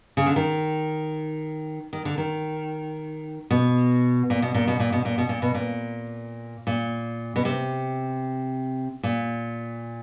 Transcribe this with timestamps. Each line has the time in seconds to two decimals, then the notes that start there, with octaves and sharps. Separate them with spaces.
0.17 C#3
0.26 D3
0.36 D#3
1.93 D#3
2.05 D3
2.18 D#3
3.50 B2
4.30 A#2
4.42 B2
4.54 A#2
4.67 B2
4.79 A#2
4.92 B2
5.05 A#2
5.18 B2
5.29 A#2
5.42 B2
5.55 A#2
6.67 A#2
7.36 B2
7.45 C3
9.03 A#2